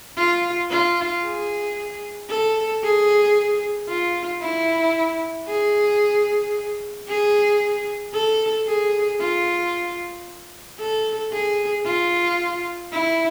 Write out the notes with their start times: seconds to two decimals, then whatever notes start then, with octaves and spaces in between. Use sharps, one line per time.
0.17 F4
0.71 F4
1.24 G#4
2.30 A4
2.83 G#4
3.89 F4
4.42 E4
5.48 G#4
7.08 G#4
8.14 A4
8.67 G#4
9.21 F4
10.80 A4
11.33 G#4
11.86 F4
12.92 E4